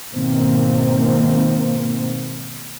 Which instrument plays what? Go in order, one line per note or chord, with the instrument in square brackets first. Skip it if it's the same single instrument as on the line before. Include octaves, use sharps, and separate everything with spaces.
[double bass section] G#2 B2 D#3 A#3 C4